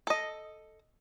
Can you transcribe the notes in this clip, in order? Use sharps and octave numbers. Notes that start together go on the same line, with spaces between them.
A4 D#5